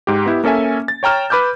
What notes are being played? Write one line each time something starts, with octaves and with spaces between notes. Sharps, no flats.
G#2 G4
B3 E4 G4
A#3 C#4 A4 E5 G#5
A6
C#5 G5 A#5 F6 E7
B4 B5 D6 F6 G6